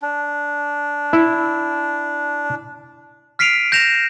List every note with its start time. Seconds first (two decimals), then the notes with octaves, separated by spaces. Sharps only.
0.02 D4
1.13 E4
3.39 F6 B6 C7 D7 D#7 F7
3.72 G6 A#6 E7 F7